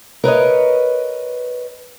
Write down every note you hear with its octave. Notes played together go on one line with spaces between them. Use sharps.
A#4 B4 C#5 D#5